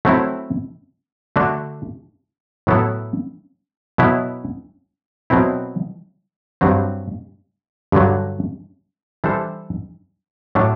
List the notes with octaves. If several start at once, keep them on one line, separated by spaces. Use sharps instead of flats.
F#3 A3 C4 E4
D3 A3 D4 F#4
A2 F#3 B3 E4 A4
B2 F#3 B3 E4
B2 F#3 C4 E4
G2 F#3 C4
G2 D3 F#3
E3 G3 D4 A4 C5
A2 F#3 A3 D4